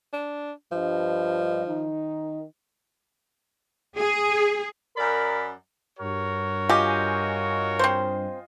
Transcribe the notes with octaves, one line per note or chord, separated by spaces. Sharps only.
D4
G2 F3 D#5
D#3 D#4
G#4
F#2 A#4 D5 B5
G2 F#4 A#4 C#5
F4 G4 D#5 G#5
C4 C5